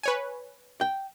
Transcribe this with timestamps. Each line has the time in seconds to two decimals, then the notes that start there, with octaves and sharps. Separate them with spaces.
0.03 B4 C#5 G#5
0.81 G5